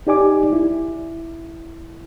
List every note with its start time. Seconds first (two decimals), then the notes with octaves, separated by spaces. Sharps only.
0.07 D#4 G4 D5 G#5 D6
0.53 E4